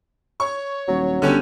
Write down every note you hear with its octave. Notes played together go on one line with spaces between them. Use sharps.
C#5 C#6
D#1 F#3
G1 D3 C#4 G4